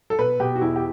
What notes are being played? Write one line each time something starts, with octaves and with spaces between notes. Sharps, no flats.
A4
B2 B4
B2 G4
F#4
E2 E4
G4